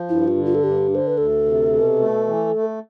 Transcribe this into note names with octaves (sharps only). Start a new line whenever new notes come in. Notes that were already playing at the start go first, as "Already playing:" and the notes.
Already playing: F3
G2 E4
F4
D3
F4
A4
G2 G4
D3 C5
B4
D2 A4
C3
B2
A3
E3
A3